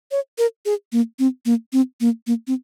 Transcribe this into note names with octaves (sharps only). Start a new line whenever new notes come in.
C#5
A#4
G#4
A#3
C4
A#3
C4
A#3
A#3
C4